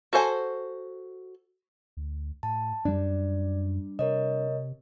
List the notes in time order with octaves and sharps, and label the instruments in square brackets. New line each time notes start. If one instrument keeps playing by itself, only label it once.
[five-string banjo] F#4 A4 C5 G#5
[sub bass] D2
[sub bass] A2 [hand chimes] A5
[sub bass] F#2 [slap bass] G3 D4 [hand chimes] D5
[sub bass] C3 [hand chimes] A#4 C#5 D#5